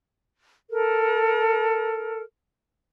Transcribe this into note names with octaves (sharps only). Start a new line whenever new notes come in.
A4 A#4